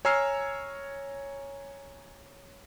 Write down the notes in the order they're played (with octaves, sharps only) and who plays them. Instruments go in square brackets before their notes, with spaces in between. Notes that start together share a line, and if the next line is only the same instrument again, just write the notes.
[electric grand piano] C#5 G#5 A#5 E6 F6 C7